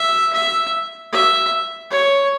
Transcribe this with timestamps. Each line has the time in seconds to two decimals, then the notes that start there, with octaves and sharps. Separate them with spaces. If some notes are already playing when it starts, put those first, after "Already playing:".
Already playing: E5
0.33 E5
1.12 E5
1.91 C#5